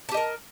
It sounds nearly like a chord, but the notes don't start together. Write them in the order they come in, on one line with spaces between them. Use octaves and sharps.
A5 G4 D#5 A#4